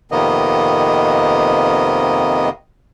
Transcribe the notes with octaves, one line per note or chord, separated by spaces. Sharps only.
F2 C3 D#3 A#3 B3 D#5